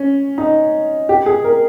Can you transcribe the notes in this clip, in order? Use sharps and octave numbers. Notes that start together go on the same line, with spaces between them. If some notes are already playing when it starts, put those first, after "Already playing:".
Already playing: C#4
D#4
G4
G#4
A#4